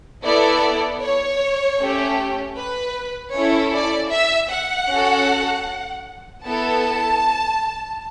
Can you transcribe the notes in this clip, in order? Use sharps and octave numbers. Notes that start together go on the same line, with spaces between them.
B3 E4 A4 D5
C#5
A3 C#4 G4
B4
C#4 E4 A4 C#5
D5
E5
F#5
C#4 F#4 A4
B3 E4 A4 A5